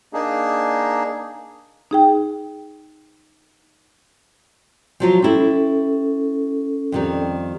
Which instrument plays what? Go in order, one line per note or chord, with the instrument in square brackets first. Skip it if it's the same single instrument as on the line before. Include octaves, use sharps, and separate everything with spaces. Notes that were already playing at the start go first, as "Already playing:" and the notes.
[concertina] A#3 D4 D#4 G#4
[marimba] D#4 G#4 G5
[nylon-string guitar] F3 F#3 F4
[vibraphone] C#4 A4 [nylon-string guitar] E4 G4
[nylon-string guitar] F2 D#3 G3